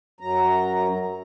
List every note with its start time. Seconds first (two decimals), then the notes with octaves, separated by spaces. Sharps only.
0.20 F#2 F#3 A#5